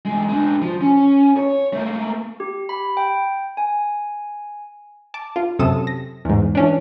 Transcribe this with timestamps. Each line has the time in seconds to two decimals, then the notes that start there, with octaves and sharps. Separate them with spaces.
0.05 E2 G#3
0.29 G#3 D4
0.62 F3
0.81 C#4
1.37 C#5
1.73 A3 A#3
2.40 G4
2.69 B5
2.97 G5
3.57 G#5
5.14 A5 D6
5.36 F4
5.59 F#2 C3 A4 D#6 E7
5.87 A#6
6.25 E2 G#2
6.55 E3 C#4 D4